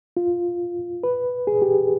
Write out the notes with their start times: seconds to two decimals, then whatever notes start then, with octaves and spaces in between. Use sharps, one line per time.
0.17 F4
1.04 B4
1.47 G#4
1.62 G4